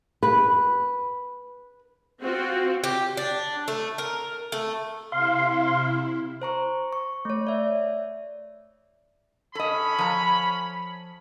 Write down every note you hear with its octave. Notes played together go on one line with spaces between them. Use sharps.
B4
C4 F4 F#4
G4
D4
A3
A#4
A3
C3 E4 F5 C6
C5 A#5 C#6
C#6
A3 C#5
D5 E5
C#4 A4 D#5 B5
F3 A#5